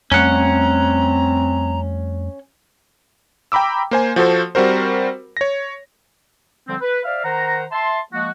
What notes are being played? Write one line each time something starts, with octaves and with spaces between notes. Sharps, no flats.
F2 G3 A3 C4 C#4 F#5 A#5
G5 A#5 B5 D6 E6
A#3 C5 G#5
F3 F#4 A4 C5
G3 C4 F#4 A#4 C5
C#5 A#6
D3 F3 G3 C4
B4
C5 D5 E5 F5
D#3 C5 F#5 A#5
E5 A5 C6
F3 G#3 A#3 F#4